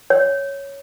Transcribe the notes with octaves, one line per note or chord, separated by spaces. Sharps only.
C#5